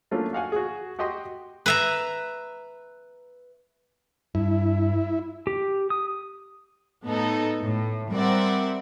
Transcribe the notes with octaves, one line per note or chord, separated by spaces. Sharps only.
F#3 A3 A#3 C#4 D4 F4
F#4 F5 F#5 G#5
F#4 G#4
F#4 G4 D#5 G5 C6 D#6
B4 E5 A#5
G2 E4
G4
D#6
A2 B3 D#4 A4
A2
G3 C4 A#4 D5 E5 F#5